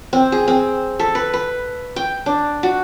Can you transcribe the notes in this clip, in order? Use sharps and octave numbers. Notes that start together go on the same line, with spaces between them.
C4
G#4
C4
A4
B4
B4
G5
D4
F#4